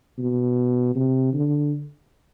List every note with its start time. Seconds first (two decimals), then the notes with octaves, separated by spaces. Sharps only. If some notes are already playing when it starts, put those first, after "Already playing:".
0.18 B2
0.95 C3
1.33 D3